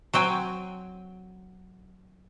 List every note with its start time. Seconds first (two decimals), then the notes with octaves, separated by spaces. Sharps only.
0.14 F#3 C4 G5 G#5